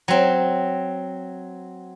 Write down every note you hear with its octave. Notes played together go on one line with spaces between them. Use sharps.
F#3 C4